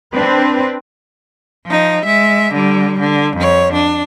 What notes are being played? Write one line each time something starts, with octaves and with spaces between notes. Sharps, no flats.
C4 D4 B4
F3 D#4
G#3 E5
D3 G3
D3
F2 C#5
D4